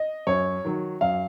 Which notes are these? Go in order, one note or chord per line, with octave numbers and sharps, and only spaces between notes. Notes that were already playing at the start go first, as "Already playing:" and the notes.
Already playing: D#5
F#2 C#5
D#3 F#3
F#2 F5